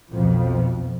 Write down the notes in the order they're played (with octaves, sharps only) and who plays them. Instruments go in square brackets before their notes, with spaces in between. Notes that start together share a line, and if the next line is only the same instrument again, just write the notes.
[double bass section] B1 F2 F3